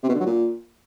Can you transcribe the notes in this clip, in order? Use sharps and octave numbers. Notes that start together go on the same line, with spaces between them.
C3
B2
D3
F#3
A#2